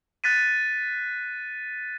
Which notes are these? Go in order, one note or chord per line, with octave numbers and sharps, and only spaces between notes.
F#6 A6 B6 D#7